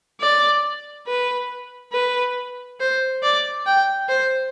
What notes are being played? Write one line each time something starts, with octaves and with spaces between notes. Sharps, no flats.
D5
B4
B4
C5
D5
G5
C5